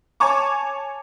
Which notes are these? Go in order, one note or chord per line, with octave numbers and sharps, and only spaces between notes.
C#5 G#5 A5 C#6 D6